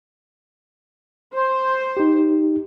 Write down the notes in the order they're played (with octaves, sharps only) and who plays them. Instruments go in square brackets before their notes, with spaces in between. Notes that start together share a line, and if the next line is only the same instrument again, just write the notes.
[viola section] C5
[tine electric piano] D#4 G4